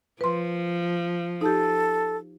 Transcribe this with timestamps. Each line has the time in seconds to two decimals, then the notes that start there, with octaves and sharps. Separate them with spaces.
0.21 F3 B4 C6
1.41 D#4 G4 A4